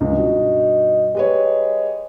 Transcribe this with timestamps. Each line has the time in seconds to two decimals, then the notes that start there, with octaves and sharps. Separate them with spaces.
0.01 C#2 D#4
0.13 G2 B2
1.15 G#3 G4 B4 C#5